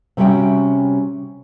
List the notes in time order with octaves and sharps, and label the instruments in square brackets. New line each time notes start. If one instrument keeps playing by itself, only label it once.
[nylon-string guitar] C3 G3 C#4 F#4 E5 G5